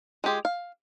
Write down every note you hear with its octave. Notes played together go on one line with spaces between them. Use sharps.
G#3 F4 G4 G#4
F5